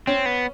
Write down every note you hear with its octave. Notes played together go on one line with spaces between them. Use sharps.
C4 C#4
B3